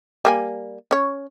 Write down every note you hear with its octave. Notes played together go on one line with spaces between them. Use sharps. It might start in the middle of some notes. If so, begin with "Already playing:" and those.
G3 A#3 G#5
C#4 C#5